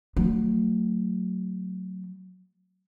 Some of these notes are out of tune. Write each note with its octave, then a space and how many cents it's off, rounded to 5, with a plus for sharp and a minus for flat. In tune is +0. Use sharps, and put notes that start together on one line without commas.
F#3 +0 A3 +25